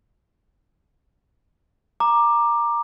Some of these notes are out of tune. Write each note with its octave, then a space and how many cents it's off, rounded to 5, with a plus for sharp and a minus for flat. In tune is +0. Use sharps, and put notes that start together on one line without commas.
A#5 +5 D6 +15